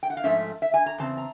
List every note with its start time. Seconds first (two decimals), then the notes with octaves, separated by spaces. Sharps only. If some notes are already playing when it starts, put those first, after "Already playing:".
0.03 G5
0.10 F#5
0.17 F5
0.24 G#2 F3 A3 C#4 E5
0.62 E5
0.74 G#5
0.86 A#5
0.98 E2 C#3 C4 A5
1.17 A#5